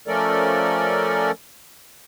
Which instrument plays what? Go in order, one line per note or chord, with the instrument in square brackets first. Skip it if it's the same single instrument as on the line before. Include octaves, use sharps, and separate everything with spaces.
[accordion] F3 A3 C#4 A4 A#4 D5